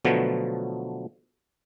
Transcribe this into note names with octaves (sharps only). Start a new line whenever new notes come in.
B2 D3 F3 F#3 A3 B3